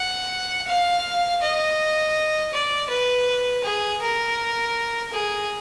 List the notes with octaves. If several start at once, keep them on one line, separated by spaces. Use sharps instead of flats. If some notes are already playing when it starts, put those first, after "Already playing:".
Already playing: F#5
F5
D#5
D5
B4
G#4
A#4
G#4